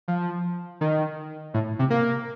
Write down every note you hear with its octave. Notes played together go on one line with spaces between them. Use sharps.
F3
D#3
A2
C3
A#3